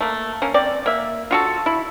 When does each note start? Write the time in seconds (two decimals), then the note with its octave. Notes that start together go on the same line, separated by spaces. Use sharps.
0.01 A3 A#3
0.42 A#3 C#4
0.54 C4 D5
0.86 A#3 E5
1.31 F4 F#4 A4
1.66 E4